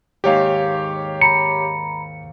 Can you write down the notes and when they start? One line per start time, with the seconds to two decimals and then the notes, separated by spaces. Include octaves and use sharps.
0.24 D#2 G#2 D#3 G4 C#5 F5
1.21 A#5 B5 C#7